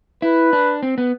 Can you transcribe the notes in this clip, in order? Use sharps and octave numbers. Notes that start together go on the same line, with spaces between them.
E4 B4
D4
C4
B3